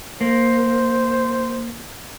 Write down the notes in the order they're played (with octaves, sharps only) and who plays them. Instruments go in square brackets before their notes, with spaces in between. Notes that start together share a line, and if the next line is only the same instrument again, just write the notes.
[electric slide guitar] A#3 [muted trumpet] C5